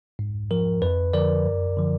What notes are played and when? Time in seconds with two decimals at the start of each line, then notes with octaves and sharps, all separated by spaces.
0.19 G#2
0.51 F3 A#4
0.82 F2 B4
1.13 D3 F3 A#4 D5
1.46 F#2
1.77 D3 F3